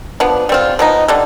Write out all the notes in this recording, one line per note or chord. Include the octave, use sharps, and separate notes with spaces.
F3 B3 D4
G3 C4 F4
F3 B3 D#4
D3 G3 D4